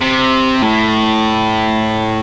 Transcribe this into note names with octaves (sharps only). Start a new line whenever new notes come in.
C3
A2